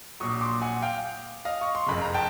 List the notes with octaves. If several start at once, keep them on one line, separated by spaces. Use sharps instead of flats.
A#1 A#2 F#3 C#6 D#6
C6 D6
F#5 G#5
F5 G5
D#5 F5
C#6
C6
F#1 F2 C#3 B5
A#5
G5 A5